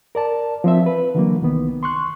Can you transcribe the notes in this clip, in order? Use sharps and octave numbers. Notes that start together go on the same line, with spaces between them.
A#4 D5 A5
F3 C4 E5
B4
D3 E3 F#3 A#3
C2 D#3 B3
C6 C#6 F#6